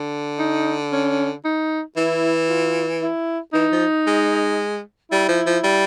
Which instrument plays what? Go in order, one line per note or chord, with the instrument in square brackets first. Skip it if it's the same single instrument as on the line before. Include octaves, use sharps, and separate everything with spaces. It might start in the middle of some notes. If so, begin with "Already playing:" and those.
Already playing: [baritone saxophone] D3
[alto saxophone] D#4
C#4
D#4
[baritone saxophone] E3 [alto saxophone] E4
[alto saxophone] F4
E4
[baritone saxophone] E3 [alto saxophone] D#4
[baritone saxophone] F3
G#3
[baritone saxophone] G3 [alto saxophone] E4
[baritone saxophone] F3
F3
G3